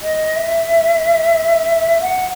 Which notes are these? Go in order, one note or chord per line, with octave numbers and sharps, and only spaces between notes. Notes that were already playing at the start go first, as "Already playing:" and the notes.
D#5
E5
F#5